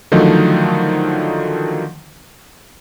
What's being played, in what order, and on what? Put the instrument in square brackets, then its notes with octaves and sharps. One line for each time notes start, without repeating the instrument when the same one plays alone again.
[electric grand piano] D3 D#3 F3 F#3 A3 D#4